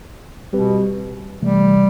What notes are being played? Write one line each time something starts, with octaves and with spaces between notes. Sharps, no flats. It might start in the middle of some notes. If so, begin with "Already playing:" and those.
B2 G3 C4 G4 B4
C3 E3 G3 A3